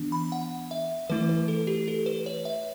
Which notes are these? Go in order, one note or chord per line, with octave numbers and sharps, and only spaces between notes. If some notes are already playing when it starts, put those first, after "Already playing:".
Already playing: E3 B3 D4
B5
F#5
E5
E3 A3 E4 B4
B4
A4
G4
A4
B4
C#5
E5